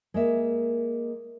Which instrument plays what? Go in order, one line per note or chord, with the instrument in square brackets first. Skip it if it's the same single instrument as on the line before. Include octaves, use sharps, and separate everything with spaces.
[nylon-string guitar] G#3 A#3 E5